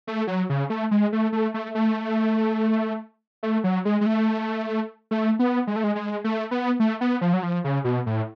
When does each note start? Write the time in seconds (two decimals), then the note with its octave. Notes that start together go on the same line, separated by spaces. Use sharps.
0.07 A3
0.27 F#3
0.50 C#3
0.70 A3
0.91 G#3
1.13 A3
1.32 A3
1.54 A3
1.75 A3
3.43 A3
3.64 F#3
3.85 G#3
4.01 G#3
4.06 A3
5.11 A3
5.39 B3
5.67 G#3
5.76 A3
5.84 G#3
5.95 G#3
6.24 A3
6.51 B3
6.80 A3
7.01 B3
7.21 F3
7.33 F#3
7.43 F3
7.64 C#3
7.84 B2
8.06 A2